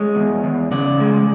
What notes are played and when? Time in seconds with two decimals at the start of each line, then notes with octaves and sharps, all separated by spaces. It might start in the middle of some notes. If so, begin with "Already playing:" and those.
Already playing: G#3 C#5
0.16 E2
0.44 E2
0.71 C#3 D5
1.00 G#3